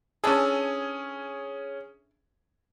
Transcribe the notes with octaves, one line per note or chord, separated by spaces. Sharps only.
E3 C#4 D4 G#4 A4